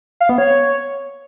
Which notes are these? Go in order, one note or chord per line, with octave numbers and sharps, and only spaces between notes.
F5
B3
C#5